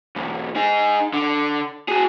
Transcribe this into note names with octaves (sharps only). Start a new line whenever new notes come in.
B1 E2
D#4 G#4
D3
F#4 G#4